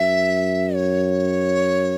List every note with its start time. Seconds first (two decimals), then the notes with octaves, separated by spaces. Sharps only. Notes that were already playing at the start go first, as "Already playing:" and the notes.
Already playing: F#2 E5
0.75 C#5